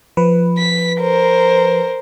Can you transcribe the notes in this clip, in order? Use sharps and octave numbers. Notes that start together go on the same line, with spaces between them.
F3 B4
B6
A#4 C5